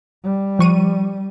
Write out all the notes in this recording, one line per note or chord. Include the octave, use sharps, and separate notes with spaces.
G3
F3 C#6 D#7